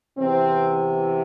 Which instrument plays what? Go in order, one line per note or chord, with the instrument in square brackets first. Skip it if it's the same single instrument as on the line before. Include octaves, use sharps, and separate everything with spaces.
[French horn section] E2 C3 E3 C4